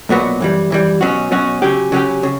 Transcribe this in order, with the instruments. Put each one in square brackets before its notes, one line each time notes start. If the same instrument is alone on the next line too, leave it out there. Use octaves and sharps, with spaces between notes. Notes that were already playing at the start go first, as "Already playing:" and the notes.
[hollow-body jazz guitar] B1 A#2 F#3 B3 F#4
F#2 E3 G3
F#2 E3 G3
B2 F#3 C#4 F#4
B2 F#3 C#4 F#4
C#3 F#3 C#4 G4
C#3 F#3 C#4 G4
C#3